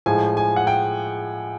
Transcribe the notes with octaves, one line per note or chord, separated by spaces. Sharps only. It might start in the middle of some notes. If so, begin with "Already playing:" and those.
A2 F3 G#3 G#5
G#5
F#5
G5